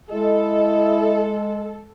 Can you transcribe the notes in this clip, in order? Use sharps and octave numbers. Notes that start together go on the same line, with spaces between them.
G#3 E4 A4 D#5